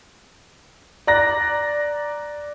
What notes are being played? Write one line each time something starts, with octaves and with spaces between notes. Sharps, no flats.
D5 A#5 F#6 A#6